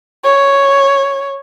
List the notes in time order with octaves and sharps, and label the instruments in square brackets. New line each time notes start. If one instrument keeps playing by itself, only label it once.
[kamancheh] C#5